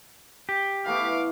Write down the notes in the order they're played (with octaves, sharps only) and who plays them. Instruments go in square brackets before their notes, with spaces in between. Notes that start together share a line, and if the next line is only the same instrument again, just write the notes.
[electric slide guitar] G4
[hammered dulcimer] E3 A3 B3 [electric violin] F5 D6